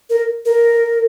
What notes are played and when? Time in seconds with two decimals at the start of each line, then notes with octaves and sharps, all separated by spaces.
0.10 A#4
0.45 A#4